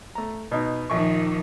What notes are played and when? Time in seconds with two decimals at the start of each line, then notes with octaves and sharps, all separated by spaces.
0.15 A3 A#5
0.52 B2 D#4
0.90 A#1 D#3 F3 C#6